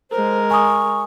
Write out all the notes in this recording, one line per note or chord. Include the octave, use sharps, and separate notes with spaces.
G#3 A#4 C5
G#5 C#6 D#6